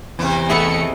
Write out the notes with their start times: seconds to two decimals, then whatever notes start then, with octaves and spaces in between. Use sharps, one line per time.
0.19 E2 C3 E3
0.50 A3 B3 E4 G#4 D#5 C#7